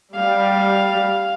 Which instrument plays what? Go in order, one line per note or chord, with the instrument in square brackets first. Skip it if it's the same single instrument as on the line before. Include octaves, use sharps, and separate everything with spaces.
[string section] G3 [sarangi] F5